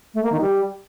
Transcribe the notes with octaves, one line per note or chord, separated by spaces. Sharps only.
A3
A#3
D#3
G3